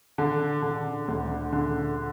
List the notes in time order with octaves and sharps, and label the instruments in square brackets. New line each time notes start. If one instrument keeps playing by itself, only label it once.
[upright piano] D3
D3
D2
D3